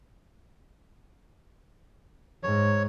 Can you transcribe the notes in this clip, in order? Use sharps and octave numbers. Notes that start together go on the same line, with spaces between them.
G#2 C#5